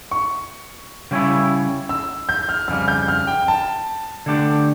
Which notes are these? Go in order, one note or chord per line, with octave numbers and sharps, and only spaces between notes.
C#6
C#3 G3 C#4 E4
E6
G6
F6
F2 C#3 G3 F6
G6
F6
G5
A5
D3 A3 D4 G4